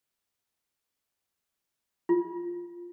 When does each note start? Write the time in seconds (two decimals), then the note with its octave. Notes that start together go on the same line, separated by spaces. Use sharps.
2.09 F4